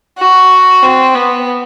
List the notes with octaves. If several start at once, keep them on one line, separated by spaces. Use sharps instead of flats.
F#4
C4
B3